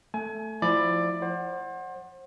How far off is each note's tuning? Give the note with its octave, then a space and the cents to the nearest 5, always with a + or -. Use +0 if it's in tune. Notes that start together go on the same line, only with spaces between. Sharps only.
A3 +0 G#5 +30
F3 +0 E4 +0 D5 +15
C5 +35 F#5 +0